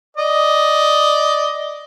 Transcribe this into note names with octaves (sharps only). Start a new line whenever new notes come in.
D5 D#5